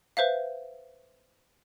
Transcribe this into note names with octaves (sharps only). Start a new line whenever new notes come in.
B4 C5 E5 F5